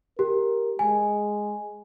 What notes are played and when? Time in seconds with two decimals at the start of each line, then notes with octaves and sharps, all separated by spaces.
0.19 G4 A#4
0.79 G#3 G#5